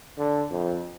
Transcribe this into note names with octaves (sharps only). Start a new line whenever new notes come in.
D3
F2